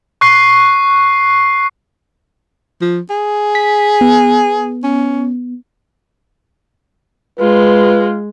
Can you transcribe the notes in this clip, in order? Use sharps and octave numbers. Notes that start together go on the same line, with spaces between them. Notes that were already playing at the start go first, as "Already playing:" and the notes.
C#6 F#6 C7
F3
G#4
B6
B3
C#4
G#3 F4 B4